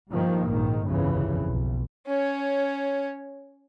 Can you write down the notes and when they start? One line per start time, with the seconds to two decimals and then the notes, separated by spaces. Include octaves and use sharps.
0.11 G2 D#3 F3 A#3
0.49 A#1 G#2 D#3
0.85 G1 C2 F2 C#3 E3
1.47 B1
2.07 C#4 C#5